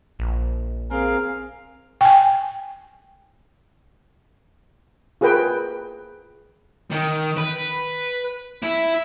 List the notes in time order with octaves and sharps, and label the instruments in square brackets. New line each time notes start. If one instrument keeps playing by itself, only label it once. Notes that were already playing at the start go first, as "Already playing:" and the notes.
[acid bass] A#1
[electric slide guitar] C4 [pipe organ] G#4 A#4 F5
[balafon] G5 G#5
[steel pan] F4 G#4 A#4 B4 G5
[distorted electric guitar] D#3
B4
E4